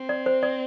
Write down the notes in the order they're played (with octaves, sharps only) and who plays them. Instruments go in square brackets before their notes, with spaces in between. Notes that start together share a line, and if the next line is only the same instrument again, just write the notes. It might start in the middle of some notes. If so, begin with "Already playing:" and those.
Already playing: [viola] C4
[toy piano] D5
C5
D5